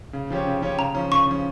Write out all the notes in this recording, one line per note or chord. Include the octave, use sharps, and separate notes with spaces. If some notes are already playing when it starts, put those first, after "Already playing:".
C#3
F3 C#4 G4 C#5
C#3
F3 C#4 G4 C#5
C#3 A#5
F3 C#4
C#3 C#6
F3 C#4